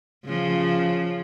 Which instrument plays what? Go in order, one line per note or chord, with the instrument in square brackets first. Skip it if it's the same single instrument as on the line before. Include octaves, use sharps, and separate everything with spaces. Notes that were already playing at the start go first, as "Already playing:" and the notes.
[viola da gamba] C#3 F3